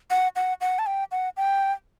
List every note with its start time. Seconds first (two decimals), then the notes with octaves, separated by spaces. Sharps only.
0.10 F#5
0.36 F#5
0.61 F#5
0.79 A5
0.86 G5
1.12 F#5
1.37 G5